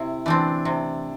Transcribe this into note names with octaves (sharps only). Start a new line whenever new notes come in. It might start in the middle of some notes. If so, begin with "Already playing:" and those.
Already playing: C3 E4
E3 A3 C4 D4
C3